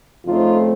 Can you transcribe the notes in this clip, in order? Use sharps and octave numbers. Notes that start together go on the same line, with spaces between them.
F2 C#3 A3 C4 D#4 F4